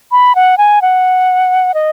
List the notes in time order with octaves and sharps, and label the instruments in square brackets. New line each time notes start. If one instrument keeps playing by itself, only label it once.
[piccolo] B5
F#5
G#5
F#5
D#5